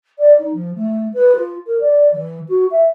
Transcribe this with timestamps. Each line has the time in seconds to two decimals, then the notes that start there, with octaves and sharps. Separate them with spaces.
0.18 D5
0.38 D#4
0.54 F3
0.75 A3
1.13 B4
1.35 F4
1.66 A#4
1.80 D5
2.12 E3
2.48 F#4
2.71 E5